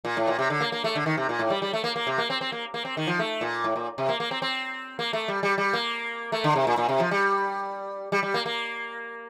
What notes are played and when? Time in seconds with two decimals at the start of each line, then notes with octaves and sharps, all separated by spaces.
0.05 A#2
0.17 A2
0.27 A#2
0.39 C3
0.50 D3
0.61 A#3
0.72 A#3
0.84 A3
0.95 D3
1.06 D#3
1.17 C3
1.29 A#2
1.39 A2
1.50 G3
1.62 G3
1.73 A3
1.84 A#3
1.96 A#3
2.07 C3
2.18 A#3
2.30 C4
2.41 C4
2.52 A#3
2.74 A#3
2.85 C4
2.97 D#3
3.07 F3
3.19 A3
3.41 A#2
3.64 A2
3.76 A#2
3.98 C3
4.09 A#3
4.20 A#3
4.31 C4
4.42 C4
4.99 A#3
5.13 A3
5.28 G3
5.43 G3
5.58 G3
5.73 A#3
6.32 A3
6.44 D3
6.56 C3
6.67 A#2
6.78 A#2
6.89 C3
7.00 F3
7.11 G3
8.12 G3
8.23 G3
8.34 A#3
8.46 A#3